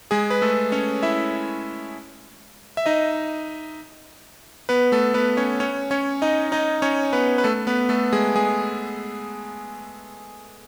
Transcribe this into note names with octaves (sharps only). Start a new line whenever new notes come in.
G#3 G#4
B4
A3 A4
C#4 C#5
E4 E5
E5
D#4 D#5
B3 B4
A3 A4
B3 B4
C#4 C#5
C#4 C#5
C#4 C#5
D#4 D#5
D#4 D#5
C#4 C#5
B3 B4
B4
A3 A4
B3 B4
A3 A4
G#3 G#4
G#3 G#4